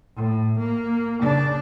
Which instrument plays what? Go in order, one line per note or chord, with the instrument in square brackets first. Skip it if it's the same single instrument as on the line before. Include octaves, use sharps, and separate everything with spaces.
[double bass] A2
A#3
C#3 D4